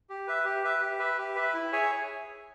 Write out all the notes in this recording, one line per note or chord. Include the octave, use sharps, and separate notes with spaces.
G4
B4 E5
G4
B4 E5
G4
B4 E5
G4
B4 E5
E4
G#4 C#5 E5 G#5